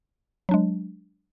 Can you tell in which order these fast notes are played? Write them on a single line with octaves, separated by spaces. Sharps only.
F#3 D4 G#3